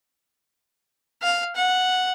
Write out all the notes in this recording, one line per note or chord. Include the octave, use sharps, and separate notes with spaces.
F5
F#5